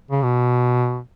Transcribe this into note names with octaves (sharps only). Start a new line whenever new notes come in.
C#3
B2